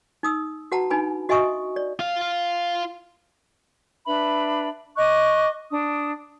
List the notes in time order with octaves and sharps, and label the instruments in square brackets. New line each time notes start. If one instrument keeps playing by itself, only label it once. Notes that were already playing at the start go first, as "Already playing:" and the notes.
[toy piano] D#4 D#6 E6
F#4 B4 F#5 A5 A#5
D4 D#4 B4 G#5 B5
F#4 D#5 E5 G#5 C#6 D#6
D5
[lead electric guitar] F4 F5
[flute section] D4 B4 E5 B5
D#5 C#6 D6 F#6
D4 D#6